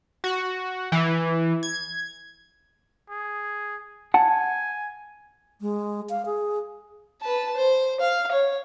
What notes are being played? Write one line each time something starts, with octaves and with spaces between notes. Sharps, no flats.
F#4
E3
G#6
G#4
F#5 G#5 A5
G#3
F5
G#4
B4 A5
C5
F5
C#5